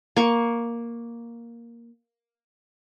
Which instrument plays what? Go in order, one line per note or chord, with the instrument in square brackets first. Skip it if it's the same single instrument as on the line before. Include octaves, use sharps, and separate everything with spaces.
[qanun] A#3 C#6